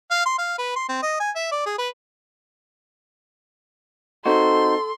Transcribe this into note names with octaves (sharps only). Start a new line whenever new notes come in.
F5
C6
F5
B4
C6
C4
D#5
G#5
E5
D5
G#4
B4
C4 D#4 F#4 A4 C6